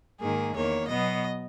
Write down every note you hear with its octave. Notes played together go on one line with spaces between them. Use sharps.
G#2 D#3 A#3 G#4
E2 D#3 A#3 C#5
B2 F#3 B3 D#5